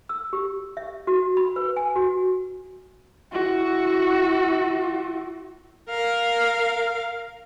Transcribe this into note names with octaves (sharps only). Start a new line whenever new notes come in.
E6
G4
E5
F#4
B5
B4
G#5
F#4
E4 F#4
A#4 F5